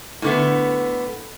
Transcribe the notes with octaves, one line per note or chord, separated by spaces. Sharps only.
A2 D3 B3